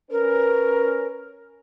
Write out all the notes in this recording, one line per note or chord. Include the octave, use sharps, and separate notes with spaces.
C#4 A#4 B4